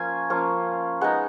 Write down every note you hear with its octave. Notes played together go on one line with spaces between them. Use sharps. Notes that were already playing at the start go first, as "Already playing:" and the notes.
Already playing: F3 A#3 C#4 F4 G#5
F3 A#3 C#4 F4
G#3 B3 D#4 F#5